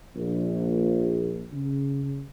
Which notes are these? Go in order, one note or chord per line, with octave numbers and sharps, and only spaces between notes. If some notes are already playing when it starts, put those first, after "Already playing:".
A#1
C#3